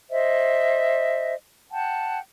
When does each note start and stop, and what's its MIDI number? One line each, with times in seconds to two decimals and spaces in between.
0.10 1.34 72
0.10 1.34 75
0.10 1.34 76
1.71 2.19 78
1.71 2.19 79
1.71 2.19 81